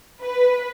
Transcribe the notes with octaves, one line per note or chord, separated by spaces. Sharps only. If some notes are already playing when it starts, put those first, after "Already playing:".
B4